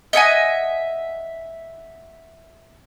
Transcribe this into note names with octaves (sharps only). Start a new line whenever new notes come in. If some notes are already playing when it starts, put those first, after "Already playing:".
D#5 E5 F#5 G#5